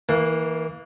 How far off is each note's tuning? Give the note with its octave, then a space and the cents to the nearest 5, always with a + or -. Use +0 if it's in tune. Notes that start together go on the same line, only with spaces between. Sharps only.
E3 -25 A#3 +0